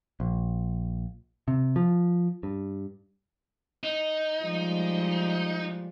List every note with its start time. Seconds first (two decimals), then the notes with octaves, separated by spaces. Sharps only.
0.20 A#1
1.48 C3
1.76 F3
2.43 G2
3.84 D#4
4.43 F3 G3 G#3